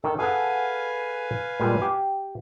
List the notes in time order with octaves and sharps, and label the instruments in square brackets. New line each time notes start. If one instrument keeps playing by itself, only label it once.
[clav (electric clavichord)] D#3 [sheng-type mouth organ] A4
[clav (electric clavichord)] G#4 A4 F#5 [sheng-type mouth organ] B4 F5 G#5
[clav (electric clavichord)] A#2 G3 G#3
G4